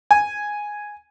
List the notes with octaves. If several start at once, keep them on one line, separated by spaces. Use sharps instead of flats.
G#5